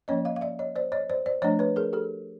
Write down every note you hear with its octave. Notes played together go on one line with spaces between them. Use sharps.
F3 A#3 C#4 C#5 D#5
D#5 F5
F5
D5 E5
C#5 D#5
C5 D5
C#5 D#5
C5 D5
C5 D5
F3 A3 D4 C#5 D#5
B4 C#5
G#4 A#4
G4 A4